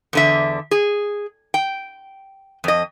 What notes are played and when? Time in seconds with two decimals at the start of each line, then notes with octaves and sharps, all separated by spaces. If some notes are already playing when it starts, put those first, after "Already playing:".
0.13 E2 D3 E5
0.71 G#4
1.54 G5
2.64 F2 D#5